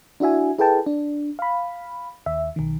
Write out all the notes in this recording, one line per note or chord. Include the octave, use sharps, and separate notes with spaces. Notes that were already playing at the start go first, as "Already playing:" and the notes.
D4 E4 F#4 E5 G#5
E4 G#4 A4 B4 G5 A5
D4
F5 B5
D#2 E5
B1 D#3